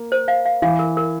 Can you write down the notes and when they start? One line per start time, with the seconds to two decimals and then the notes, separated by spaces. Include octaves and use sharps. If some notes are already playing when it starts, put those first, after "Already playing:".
Already playing: A#3
0.12 C5
0.28 F5
0.46 F5
0.62 E3 F5
0.79 A#4
0.97 A#4